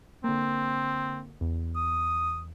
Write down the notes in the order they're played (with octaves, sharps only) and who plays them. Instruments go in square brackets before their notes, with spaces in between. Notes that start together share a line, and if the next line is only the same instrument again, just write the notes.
[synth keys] D3 A#3 [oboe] C4
[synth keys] E2
[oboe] D#6